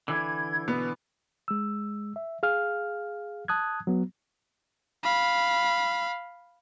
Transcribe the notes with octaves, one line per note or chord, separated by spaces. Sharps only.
D3 E3 G#6
B2 B3
G#3 E6
E5
G#4 F5 F6
A5 D#6 F#6 G#6
F#3 B3
F5 B5